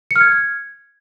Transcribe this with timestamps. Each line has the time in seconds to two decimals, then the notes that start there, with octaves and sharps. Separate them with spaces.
0.11 C#7
0.16 F6
0.21 G#6